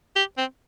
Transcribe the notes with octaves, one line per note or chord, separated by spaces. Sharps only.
G4
C4